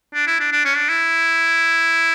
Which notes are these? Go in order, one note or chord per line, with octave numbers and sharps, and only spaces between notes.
D4
E4
D4
D4
C#4
D4
E4